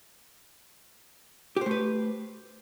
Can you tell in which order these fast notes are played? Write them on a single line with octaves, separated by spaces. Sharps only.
G4 C5 A3 B4